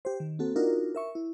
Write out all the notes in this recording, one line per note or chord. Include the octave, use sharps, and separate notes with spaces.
G4 C5
D#3
A#3 C4 F#4 A4
D4 D#4 F4 F#4 A#4
A#4 E5 C#6
E4